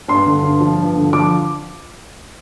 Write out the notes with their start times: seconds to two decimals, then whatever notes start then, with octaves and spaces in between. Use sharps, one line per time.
0.08 G2 C6
0.26 D3
0.43 G2
0.60 F3
0.78 G2
0.96 D3
1.12 F3 D6